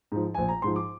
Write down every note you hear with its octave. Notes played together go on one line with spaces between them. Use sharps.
G#2 F3
A#1 G#5
A#5
G#2 F3 C6
D6